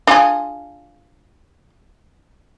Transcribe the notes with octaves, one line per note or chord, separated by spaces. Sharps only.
D4 F4 G#4